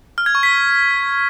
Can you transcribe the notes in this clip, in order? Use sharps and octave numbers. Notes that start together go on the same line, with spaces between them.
F6
G#6
C#6
B6